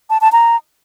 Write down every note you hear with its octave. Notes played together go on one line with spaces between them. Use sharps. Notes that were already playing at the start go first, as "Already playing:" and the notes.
A5
A5
A#5